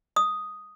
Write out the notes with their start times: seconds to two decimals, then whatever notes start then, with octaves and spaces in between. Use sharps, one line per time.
0.16 D#6